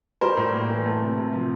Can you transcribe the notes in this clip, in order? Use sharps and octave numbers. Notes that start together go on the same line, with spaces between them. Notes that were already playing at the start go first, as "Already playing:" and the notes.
G3 A#4 C5
A2
A#3
E3
A3
C3
C3
F3